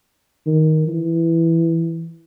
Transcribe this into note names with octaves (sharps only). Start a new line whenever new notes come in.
D#3
E3